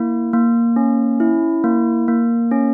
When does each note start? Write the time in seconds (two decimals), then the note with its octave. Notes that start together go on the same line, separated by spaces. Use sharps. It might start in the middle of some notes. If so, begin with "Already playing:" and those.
Already playing: A#3 E4
0.33 A#3
0.76 C#4
1.20 E4
1.64 A#3
2.08 A#3
2.51 C#4